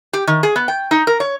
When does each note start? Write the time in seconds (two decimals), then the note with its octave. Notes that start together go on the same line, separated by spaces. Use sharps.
0.13 G4
0.27 D#3
0.43 G#4
0.56 B3
0.68 G5
0.91 D#4
1.07 A#4
1.20 C#5